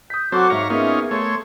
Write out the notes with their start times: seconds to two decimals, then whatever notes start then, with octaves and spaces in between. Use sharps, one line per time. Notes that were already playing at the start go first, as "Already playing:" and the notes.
0.10 D#6 G6 B6
0.32 F#3 C4 F#4 A4 C5 C#6 D6 F#6
0.50 G#2 C#5 E5 F5 A#5 C#7
0.70 A#3 B3 C#4 D#4 F4 G#4
1.11 A3 C#5 C6 G#6